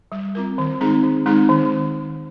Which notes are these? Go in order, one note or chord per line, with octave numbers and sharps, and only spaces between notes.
G3
C4 F4 A#4
D#3
G#3 C4 D#4 G#4
D#3
G#3 C4 D#4 G#4
D#3